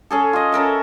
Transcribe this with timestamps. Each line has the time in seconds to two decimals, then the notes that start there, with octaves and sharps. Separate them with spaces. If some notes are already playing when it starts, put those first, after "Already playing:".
0.11 C#4 G#4 A4
0.33 F4 D#5
0.52 C#4 A4 A#4 E5